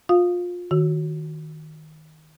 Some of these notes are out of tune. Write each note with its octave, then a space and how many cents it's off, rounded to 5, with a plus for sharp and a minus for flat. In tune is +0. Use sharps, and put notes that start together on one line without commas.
F4 +25 F5 +0
D#3 +0 F#4 +0